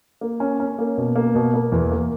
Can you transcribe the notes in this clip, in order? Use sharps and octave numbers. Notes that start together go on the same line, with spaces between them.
A#3
C#4
C#4
A#3
B2
A#3
B2
A#3
E2
A#3